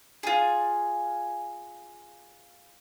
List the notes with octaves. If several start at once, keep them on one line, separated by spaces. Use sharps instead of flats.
F4 G#4